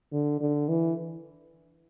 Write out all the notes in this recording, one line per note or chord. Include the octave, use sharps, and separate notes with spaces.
D3
D3
E3